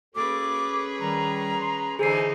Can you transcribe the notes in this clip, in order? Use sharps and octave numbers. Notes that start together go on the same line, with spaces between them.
A#3 C#4 F#4 G#4 A4 B4 D6
D#3 G3 A#5
C6
D3 E3 D#4 G#4 A4 C5 G#5 C7